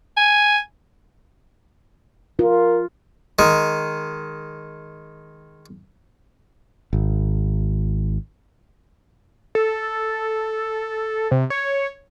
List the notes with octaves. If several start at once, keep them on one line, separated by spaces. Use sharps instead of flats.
G#5
F4 A#4
D#3 G#3
G#1
A4
C3
C#5